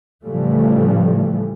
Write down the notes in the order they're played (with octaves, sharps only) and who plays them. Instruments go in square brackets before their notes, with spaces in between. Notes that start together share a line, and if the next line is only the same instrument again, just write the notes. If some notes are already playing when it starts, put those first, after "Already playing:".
[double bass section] A2 C#3 E3 F3 G3 A3